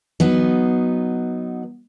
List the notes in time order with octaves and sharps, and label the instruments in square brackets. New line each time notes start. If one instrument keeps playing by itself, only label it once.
[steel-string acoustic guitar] F#3 B3 D#4